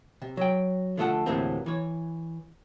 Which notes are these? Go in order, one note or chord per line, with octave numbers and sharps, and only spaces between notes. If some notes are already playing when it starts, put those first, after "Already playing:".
C3
F#3 G5
D3 F3 A3 F4 A4 F#5
D2 A2 C3 E3 A#3 C4
E3 C#5